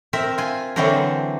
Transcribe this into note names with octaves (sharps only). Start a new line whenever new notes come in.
C4 A#4 E5
F4 G#5
D3 E3 F#3 C4 D4 A#4